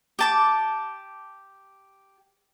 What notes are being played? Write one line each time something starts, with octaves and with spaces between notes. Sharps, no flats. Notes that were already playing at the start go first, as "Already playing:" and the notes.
G4 A5 D6